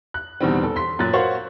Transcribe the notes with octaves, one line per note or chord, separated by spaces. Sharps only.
F#6
E2 B2 D3 D#3 G3 C4
A4
C6 B6
F#2 A#2 F#6 A6
F#4 A#4 C5 C#5 F5 F#5